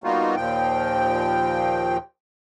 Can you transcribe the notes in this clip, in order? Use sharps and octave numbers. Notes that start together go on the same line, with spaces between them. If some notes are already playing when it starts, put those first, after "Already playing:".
G3 A#3 B3 D#4 F4 F#4
D#2 A#2 F3 G5